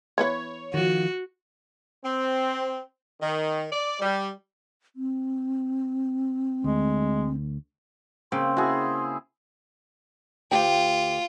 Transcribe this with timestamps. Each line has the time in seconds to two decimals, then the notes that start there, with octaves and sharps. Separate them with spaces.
0.18 E3 B3 B4 C#5
0.74 D#3 F3 F#4
2.03 C4
3.19 D#3
3.71 D5
4.00 G3
4.96 C4
6.64 D2 G#3
8.32 C#3 A#3 C4 C6
8.57 E4 F#4 G#4
10.51 D2 F4 G4 G5